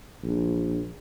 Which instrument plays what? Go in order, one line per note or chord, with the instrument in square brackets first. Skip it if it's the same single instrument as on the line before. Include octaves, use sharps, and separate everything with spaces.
[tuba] A#1